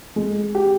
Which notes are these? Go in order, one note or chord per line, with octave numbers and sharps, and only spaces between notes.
G#3
G4